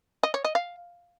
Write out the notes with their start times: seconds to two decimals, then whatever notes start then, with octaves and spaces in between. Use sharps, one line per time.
0.23 D#5
0.34 C#5
0.45 D#5
0.55 F5